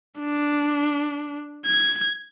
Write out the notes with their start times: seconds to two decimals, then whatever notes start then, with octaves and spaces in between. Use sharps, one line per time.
0.19 D4
1.66 G#6